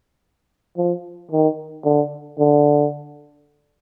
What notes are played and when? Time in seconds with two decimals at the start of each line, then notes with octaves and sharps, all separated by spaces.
0.77 F3
1.31 D#3
1.85 D3
2.39 D3